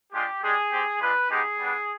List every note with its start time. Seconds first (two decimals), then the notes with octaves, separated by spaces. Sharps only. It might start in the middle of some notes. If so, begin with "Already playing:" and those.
0.13 G#3 D4 F4 G4
0.42 G#3 D4 G4 G#4
0.71 C4 G4
1.01 G#3 D4 F4 B4
1.29 G#3 B3 D#4 G4 G#4
1.59 G3 B3 D4